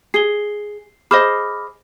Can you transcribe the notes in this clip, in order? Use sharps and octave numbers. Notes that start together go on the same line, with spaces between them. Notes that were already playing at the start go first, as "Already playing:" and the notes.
G#4 C7 G7
G#4 C5 D#5 B5 D6 F6